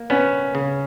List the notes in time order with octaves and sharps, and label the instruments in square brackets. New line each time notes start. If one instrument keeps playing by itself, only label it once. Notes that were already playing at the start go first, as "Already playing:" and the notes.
Already playing: [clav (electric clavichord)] A#3
[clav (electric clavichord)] B3 [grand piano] C#4
[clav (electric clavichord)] C#3